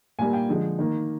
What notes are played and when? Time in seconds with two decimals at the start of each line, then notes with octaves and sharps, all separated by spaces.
0.19 A#2 G3 A#3 G#5
0.33 G5
0.48 D3 F3 G#3
0.79 D#3 A#3